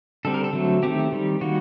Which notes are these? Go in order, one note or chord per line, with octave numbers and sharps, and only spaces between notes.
D3 G3 C4 A4
A#4
A4
D3 F#3 A3 C4
D#3 A3 C4 G4
D#3 G3 C4
D#3 G3 A#3 F#4